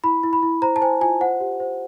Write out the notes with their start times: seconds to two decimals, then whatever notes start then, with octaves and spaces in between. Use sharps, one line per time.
0.04 E4 B5
0.23 E4
0.33 B5
0.43 E4
0.62 C5 A#5
0.76 A5
0.81 C5 G#5
1.01 F4 G#5
1.21 C5 F#5
1.40 G4
1.60 C5